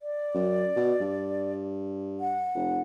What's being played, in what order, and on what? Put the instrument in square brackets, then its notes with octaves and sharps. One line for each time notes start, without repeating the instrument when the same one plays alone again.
[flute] D5
[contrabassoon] F#2
B2
G2
[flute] F#5
[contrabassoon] F1